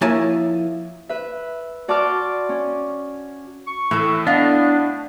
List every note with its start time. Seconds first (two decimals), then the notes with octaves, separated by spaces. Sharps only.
0.01 F3 A#3 E4 C#5 G#5 A5
1.09 B4 E5
1.88 F#4 D5 A5 C6 D6 F6
2.49 C#4
3.67 C#6
3.91 A2 E3 A4
4.27 B3 D4 D#5 F5